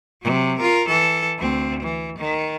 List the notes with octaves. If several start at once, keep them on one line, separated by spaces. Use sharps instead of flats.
C3 F#3
F4 A#4
E3 A4
D2 C4
E3
D#3